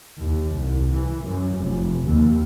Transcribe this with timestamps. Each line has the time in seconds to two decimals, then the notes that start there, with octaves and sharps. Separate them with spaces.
0.18 D#2
0.54 C2
0.93 E3
1.23 F#2
1.55 F1
2.04 D#2